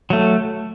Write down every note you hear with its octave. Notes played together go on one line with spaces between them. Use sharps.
F#3 A3